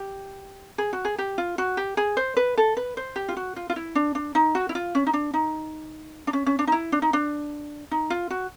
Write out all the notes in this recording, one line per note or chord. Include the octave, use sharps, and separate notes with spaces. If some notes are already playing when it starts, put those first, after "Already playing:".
Already playing: G4
G#4
F#4
G#4
G4
F4
F#4
G4
G#4
C5
B4
A4
B4
C5
G4
F4
F#4
F4
F4
E4
D4
D4
D#4
F#4
E4
F4
C#4
D#4
D4
D#4
D4
C#4
C#4
D4
D#4
E4
D4
D#4
D4
D#4
F4
F#4